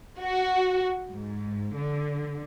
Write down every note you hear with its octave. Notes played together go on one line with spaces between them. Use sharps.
F#4
G#2
D3